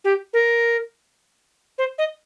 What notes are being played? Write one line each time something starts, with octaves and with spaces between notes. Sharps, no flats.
G4
A#4
C5
D#5